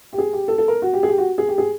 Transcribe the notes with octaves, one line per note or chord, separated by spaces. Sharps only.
G4
G#4
G4
A4
A4
A#4
F#4
G4
G#4
G4
F#4
G#4
G4
G#4